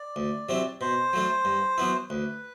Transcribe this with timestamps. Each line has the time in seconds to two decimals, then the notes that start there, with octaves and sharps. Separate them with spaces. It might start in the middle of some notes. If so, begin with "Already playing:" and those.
Already playing: D5
0.16 D2
0.49 C3 F#3 C4 E4
0.81 B2 C5
1.13 F#3 A3 D4
1.45 G2
1.78 F#3 B3 E4
2.10 D2 B4